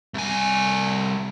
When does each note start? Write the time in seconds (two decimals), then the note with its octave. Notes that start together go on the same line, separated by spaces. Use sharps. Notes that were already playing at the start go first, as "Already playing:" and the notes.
0.15 C2 G#5